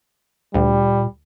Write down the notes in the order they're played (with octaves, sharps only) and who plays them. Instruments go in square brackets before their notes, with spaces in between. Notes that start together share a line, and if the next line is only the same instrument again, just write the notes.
[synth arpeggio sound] D2 [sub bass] A#2 [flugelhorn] G3